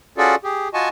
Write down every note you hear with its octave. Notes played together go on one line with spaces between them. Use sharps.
C#4 F4 F#4 G#4 A4 D5
G4 G#4
F4 F#4 D#5 G#5 A5 C#6